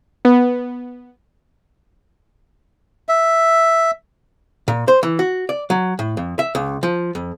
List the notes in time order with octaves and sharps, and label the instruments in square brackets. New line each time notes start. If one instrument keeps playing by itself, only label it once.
[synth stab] B3
[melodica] E5
[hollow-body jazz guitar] A#2
C5
E3
F#4
D5
F#3
A2
F2
E5
C#2
F3
F2